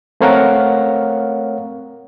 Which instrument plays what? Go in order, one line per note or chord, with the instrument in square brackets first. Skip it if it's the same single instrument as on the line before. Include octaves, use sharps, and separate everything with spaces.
[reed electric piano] A3 C4 A#4 C#5 F5 F#5